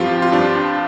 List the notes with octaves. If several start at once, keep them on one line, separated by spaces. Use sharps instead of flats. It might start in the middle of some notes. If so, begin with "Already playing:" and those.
Already playing: G2 F3 C4 F4 G4
F4
G2 D4